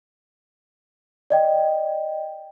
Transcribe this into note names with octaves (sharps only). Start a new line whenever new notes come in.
D5 D#5 G5